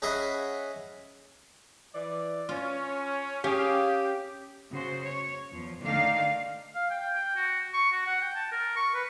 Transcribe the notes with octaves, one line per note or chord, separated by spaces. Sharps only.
C#4 G#4 D#5 E5 F#5 B5
E3 D5
C#4 F4
C#4 G4 G#4 F5
C#3 F#4 C5
C#5
E2 F3
D3 D#3 A3 D#4 D5 F5
F5
G5
G5
F#4
C#6
F#4
F#5
G5
A5
A#4
C#6
B4